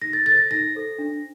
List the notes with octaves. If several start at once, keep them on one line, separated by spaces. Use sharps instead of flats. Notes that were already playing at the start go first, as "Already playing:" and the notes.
D#4 A#6
A6
A4 C5 A6
A#6
D#4 A#6
A4 C5
D4